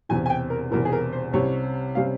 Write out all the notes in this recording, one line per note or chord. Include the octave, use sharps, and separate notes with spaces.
E1 E2 C3 G#5
G#5
G5
A#4
E1 E2 C3 A#4
G#4
A#4
C5
C2 C3 G3 C#4 C#5
C3 G3 C#4 F5